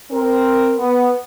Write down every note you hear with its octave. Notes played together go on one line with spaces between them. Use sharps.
C4 A#4
B3